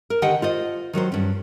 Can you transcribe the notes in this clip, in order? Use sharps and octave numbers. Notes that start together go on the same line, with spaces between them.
A#4
D3 D#3 G4 D#5 F#5 G5
F4 C5 D#5
D#3 F#3 F#4 C5
G2 C#4